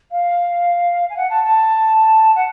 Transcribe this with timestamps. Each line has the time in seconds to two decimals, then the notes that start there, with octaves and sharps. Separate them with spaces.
0.11 F5
1.09 G#5
1.16 F#5
1.29 A5
1.43 A5
2.35 F#5